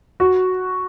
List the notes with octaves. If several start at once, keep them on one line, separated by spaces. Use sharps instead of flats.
F#4